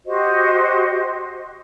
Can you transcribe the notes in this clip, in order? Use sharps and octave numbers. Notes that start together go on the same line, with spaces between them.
F#4 G4 C5 D#5